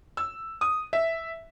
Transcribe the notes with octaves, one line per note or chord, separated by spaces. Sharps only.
E6
D#6
E5